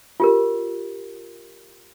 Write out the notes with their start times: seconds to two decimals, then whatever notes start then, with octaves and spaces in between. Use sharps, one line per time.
0.20 F4 G4 A#4